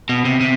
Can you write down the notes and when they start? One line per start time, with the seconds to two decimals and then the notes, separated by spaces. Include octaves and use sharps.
0.09 B2
0.25 C3
0.40 C3